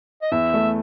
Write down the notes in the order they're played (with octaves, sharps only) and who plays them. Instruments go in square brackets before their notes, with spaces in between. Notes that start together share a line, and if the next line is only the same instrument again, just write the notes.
[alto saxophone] D#5
[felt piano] E2 [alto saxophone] E5
[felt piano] A3